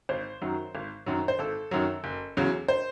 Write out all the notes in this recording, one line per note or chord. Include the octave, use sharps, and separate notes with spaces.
G#1 C5
F#2 D#3 F#3
G#1
F#2 D#3 F#3
C5
G#1 A4
F#2 D#3 F#3
F#1
E2 C#3 F#3
C5